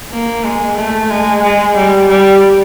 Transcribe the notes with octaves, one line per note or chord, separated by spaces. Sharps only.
A#3
G#3
A3
G#3
G#3
G3
G3